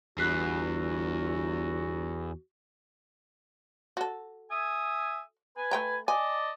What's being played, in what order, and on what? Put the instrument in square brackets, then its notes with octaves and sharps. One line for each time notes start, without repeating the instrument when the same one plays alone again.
[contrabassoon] G1 [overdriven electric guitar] E2 [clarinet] F#4 [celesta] F#6 B6 C7
[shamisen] F#4 A4
[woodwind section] E5 G#5 D#6
B4 G#5
[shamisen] A3 G5 A#5
[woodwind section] D5 D#5 A5 [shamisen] G#5